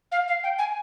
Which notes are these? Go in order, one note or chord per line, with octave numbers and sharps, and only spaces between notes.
F5
F5
G5
G#5